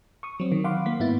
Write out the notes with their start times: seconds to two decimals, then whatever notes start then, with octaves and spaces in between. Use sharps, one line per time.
0.23 C#6 D#6
0.40 F#3 C4
0.52 D#3
0.64 F5 F#5 B5 C6 D6
0.86 A#3 B6
1.00 G#2 B3 E4 A6